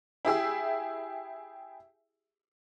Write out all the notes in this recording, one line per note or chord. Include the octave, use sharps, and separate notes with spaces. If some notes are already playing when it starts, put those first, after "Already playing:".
E4 G4 G#4 E5